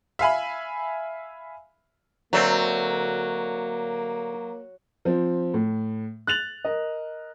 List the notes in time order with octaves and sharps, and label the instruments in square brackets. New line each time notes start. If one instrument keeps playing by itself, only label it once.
[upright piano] E5 F5 G#5 B5
[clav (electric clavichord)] D2 A3 C4 [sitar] F#3 [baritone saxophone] A#3
[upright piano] F3 C4
A2
F#6 A6 F7 F#7
A#4 D#5